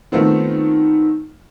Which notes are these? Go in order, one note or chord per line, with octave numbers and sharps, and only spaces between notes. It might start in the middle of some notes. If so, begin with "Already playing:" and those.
D#3 A3 B3 C4 F4